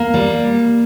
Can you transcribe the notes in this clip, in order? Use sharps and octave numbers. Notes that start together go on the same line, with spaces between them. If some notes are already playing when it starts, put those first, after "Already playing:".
Already playing: A#3
G3